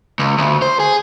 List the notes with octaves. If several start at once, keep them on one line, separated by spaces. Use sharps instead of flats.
C#2
D2
C5
G#4